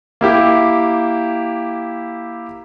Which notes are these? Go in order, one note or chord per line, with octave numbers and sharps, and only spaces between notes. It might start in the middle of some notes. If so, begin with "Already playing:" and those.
A#3 E4 G4